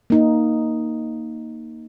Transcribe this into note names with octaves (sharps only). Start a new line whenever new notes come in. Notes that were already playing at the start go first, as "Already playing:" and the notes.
A#3 D#4